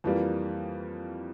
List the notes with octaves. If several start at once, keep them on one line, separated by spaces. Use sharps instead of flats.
F2 E3 G3 A#3